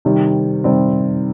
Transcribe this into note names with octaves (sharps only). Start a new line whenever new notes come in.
C3 D#3 G3 C4
C3 D#3 G3 C4